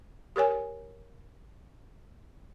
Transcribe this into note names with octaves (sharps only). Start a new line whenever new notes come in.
G4 A#4 C#5 G#5